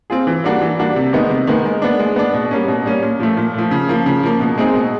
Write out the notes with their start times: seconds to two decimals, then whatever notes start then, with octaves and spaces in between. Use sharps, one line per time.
0.10 C4 F4 G#4
0.27 E3
0.44 G3 A#3 D4 F#4
0.62 E3
0.79 G3 A#3 D4 F#4
0.96 C3
1.13 D#3 G#3 B3 D#4
1.30 C3
1.47 D#3 G#3 B3 D#4
1.65 G#3
1.82 B3 D4
1.99 G#3
2.16 B3 D4
2.34 B2
2.51 G3 A#3 C#4
2.68 B2
2.85 G3 A#3 C#4
3.02 A#2
3.20 F3 A3
3.37 A#2
3.54 F3 A3
3.71 C#3
3.89 F3 A#3
4.06 C#3
4.23 F3 A#3
4.40 B2
4.58 G#3 C4 D#4 G#4
4.75 B2